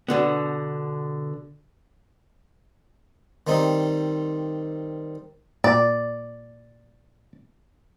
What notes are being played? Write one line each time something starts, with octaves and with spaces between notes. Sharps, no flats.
B2 D3 B3
D#3 G3 C4 D#4
A#2 D5